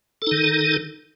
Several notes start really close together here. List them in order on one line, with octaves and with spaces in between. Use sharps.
A4 D#4 D#3